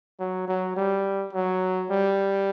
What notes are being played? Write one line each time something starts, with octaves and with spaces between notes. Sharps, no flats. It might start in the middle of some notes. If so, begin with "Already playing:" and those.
F#3
F#3
G3
F#3
G3